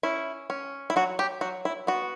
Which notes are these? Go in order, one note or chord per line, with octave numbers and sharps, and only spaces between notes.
C#4 E4
C#4
E4
F#3 F#4
G4
F#3 F#4
E4
B3 F#4